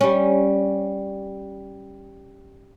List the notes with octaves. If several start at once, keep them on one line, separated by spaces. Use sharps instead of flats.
G3 C#4